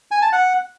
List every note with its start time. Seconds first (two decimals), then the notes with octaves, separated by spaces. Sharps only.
0.11 G#5
0.22 A5
0.32 F#5